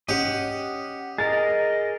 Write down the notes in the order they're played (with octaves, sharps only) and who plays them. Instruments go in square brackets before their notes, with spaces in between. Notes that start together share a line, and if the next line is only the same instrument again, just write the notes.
[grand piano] C#4 [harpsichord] G4 [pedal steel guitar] D#5 F#5
[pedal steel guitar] G#4 A#4 [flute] D#5 [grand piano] A6